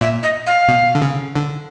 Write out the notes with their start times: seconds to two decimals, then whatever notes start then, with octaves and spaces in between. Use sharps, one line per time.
0.01 A#2 E5
0.23 D#5
0.47 F5
0.68 B2
0.95 D3
1.02 C#3
1.36 D3